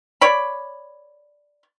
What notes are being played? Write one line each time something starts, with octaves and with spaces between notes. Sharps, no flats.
C#5 D5 B5